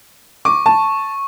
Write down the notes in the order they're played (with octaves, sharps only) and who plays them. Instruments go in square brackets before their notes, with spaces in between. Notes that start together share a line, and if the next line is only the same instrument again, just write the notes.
[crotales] C#6 [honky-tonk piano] D6
[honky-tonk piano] A5